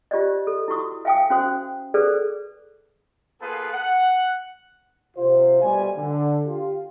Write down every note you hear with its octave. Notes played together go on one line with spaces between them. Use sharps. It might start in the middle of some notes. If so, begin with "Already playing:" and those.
F4 G4 C5 D5 D#5
A4
E4 F#4 C#6 D#6
E5 F5 G5 G#5 D#6
C#4 F#4 C5 D#6
G#4 A4 B4 C5 D5
A#3 B3 F4 G#4 A4 B4
F#5
C3 F4 C5
B2 G3 A3 C5 D5 G#5
D3
F4 G4